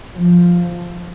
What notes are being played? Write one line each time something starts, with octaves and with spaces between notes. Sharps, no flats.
F3